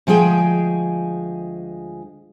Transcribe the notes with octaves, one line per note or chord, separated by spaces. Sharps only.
D2 F3 G#3 G#4 G5